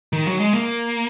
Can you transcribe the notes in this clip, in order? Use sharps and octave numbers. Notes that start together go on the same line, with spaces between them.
D#3
F#3
G#3
A#3